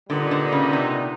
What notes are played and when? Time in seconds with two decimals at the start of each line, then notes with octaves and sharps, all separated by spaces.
0.09 A#2 D3 G3 B3 D#4
0.31 D3
0.52 C#3
0.73 C3